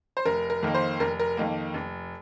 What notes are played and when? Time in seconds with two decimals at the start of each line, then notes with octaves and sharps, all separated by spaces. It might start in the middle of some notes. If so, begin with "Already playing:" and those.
0.17 C5
0.25 F1 A#4
0.50 A#4
0.63 F2 D#3 A#3
0.74 C5
1.00 F1 A#4
1.20 A#4
1.37 F2 D#3 A#3
1.74 F1